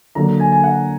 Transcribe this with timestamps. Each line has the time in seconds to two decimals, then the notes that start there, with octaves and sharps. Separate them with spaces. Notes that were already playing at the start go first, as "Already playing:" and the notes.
0.15 D3 F#3 A#3 A#5
0.40 G#5
0.52 G#5
0.64 F#5